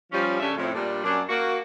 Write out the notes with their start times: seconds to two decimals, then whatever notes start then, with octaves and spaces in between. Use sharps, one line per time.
0.12 F3 G3 C#4
0.40 C#3 C#4 D4 G4 A4 E5
0.58 F2 A2
0.74 A#2 G3 D4
1.04 F#2 D4
1.29 A#3 F#4